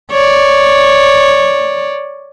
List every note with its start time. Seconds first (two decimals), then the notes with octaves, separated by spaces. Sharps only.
0.12 C#5 D5